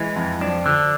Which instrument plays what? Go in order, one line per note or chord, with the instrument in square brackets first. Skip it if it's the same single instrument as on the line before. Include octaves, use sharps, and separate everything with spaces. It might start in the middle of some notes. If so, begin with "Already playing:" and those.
Already playing: [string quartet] E3 [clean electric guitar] G#3
[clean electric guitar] F2
[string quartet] F3 [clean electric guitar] D4
[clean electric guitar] D3